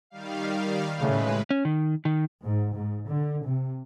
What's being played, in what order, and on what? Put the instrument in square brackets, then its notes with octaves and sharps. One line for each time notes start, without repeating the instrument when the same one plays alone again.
[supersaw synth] D#3 G3 F5
[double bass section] A2 C#3 [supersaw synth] G#3 B4
[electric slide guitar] C#4
D#3
D#3
[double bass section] G#2
G#2
D3
C3